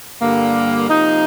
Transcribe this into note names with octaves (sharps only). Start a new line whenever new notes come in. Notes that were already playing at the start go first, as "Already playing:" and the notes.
G2 D3 G3 A#3
C3 F3 A#3 D#4